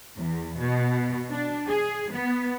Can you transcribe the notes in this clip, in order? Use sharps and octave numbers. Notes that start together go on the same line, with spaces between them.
E2
B2
D4
G#4
B3